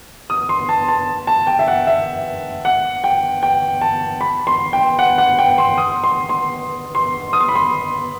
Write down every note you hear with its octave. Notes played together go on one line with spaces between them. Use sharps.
D#6
C6
A5
A5
A5
G5
E5
F#5
E5
F#5
G5
G5
A5
B5
C6
G5
F#5
F#5
G5
C6
D#6
C6
C6
C6
D#6
C6
B5
C6